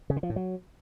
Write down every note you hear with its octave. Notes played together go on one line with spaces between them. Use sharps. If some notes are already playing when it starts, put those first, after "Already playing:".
C#3
D3
F3
A2
F#3